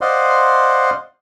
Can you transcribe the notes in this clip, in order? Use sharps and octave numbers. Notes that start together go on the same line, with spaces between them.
C5 D5 D#5 F5 F#5 C6